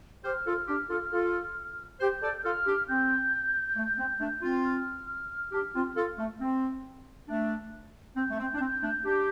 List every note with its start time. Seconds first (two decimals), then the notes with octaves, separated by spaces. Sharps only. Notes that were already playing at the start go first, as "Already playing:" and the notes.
0.24 G4 C5 F6
0.46 F4 A4
0.68 D4 G4
0.90 F4 A4
1.12 F4 A4
2.00 G4 C5 G6
2.22 A4 D5
2.38 G6
2.44 F4 A4 F6
2.66 D4 G4
2.88 C4 G6
3.76 A3
3.98 C4
4.20 A3 D4
4.42 C4 F4
4.65 F6
5.52 D4 G4
5.74 C4 F4
5.96 F4 A4
6.19 A3
6.41 C4
7.28 A3 D4
8.16 C4 G6
8.30 A3
8.39 C4
8.54 D4
8.60 C4
8.82 A3 D4
9.05 D4 G4